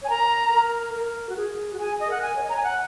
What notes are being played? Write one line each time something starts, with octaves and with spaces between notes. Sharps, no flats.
C#5
G#5
A#4 A#5
A#4
A#4
F#4
G#4
F#4
G#4 G#5
D#5
A#4 F#5
G#5
C#5
D#5
C#5 A#5
G#5
F#5